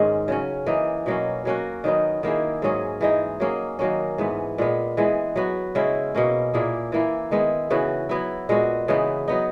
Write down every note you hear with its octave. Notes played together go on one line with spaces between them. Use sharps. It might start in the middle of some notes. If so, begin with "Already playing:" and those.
Already playing: G#2 D#3 G#3 C#4
C#3 F#3 C#4
E3 A#3 D#4
B2 F#3 A#3 C#4
F#3 A#3 C#4 F#4
D#3 F#3 B3 D#4
D#3 A#3 E4 G#4
G#2 F#3 C#4 G#4
E3 G#3 D#4
F#3 A#3 C#4 G#4
D#3 F#3 A#3 C#4
G#2 E3 B3
A#2 G#3 B3
E3 G#3 B3
F#3 B3 F#4
C#3 G#3 C#4 E4
B2 A#3 C#4
A#2 A#3 E4 G#4
E3 A#3 E4
D#3 G#3 B3 E4
C#3 E3 B3 F#4
F#3 B3 E4
A#2 G#3 B3 F#4
C#3 E3 B3 D#4
F#3 B3 D#4